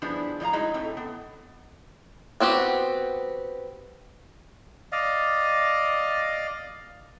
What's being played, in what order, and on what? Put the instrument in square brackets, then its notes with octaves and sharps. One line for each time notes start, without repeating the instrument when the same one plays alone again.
[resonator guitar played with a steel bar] G2 F3 B3 D4 E4 G#4
A2 F3 D#5 F5 A#5
F#3 G#3 D#4 E4 G#4
A2 A3 C4
B3
[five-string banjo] B3 C4 F#4 G4
[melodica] D5 D#5 F5